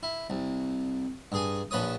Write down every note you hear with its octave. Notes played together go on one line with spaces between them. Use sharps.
E4
C2
G2 G#4 G#5
A#1 F3 B4 C#5 D#6